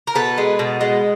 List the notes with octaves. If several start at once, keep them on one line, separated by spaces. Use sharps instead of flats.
A#4
B2 A4 B4
G#3
B2
G#3